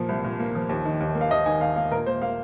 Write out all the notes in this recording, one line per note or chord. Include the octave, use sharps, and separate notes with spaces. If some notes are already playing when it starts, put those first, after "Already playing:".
Already playing: A#2 F3 A#3
C2
A#2
A#3
F3
D#2
D#3
D#2
A#3
F5
D#2 D#5
D#3 G#5
D#2 F5
A#3 F5
A#2 A#4
A#3 C5
A#3 F5